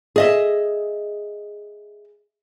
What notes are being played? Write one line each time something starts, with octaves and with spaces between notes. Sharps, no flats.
G#4 D#5 E5